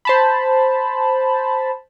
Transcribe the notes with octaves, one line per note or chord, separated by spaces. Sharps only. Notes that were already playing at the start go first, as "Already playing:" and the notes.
C5 A5 B5